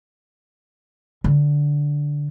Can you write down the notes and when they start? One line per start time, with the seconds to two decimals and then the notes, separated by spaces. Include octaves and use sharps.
1.24 D3